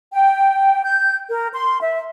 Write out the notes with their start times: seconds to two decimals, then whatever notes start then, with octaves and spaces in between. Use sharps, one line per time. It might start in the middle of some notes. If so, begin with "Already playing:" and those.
0.13 G5
0.84 G6
1.28 A#4
1.53 C6
1.81 E5